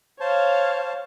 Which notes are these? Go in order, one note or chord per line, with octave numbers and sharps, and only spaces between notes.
C5 C#5 F5 A5